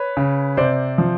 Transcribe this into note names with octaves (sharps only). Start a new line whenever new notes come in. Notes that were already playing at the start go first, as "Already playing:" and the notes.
Already playing: B4 C#5
C#3
C3 C5 D5
F3